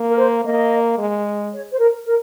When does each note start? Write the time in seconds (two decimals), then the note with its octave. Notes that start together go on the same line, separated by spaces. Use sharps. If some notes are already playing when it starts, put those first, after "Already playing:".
Already playing: A#3
0.11 A#4
0.18 C5
0.44 A#3 D#5
0.98 G#3
1.52 C#5
1.72 C5
1.79 A#4
2.05 A#4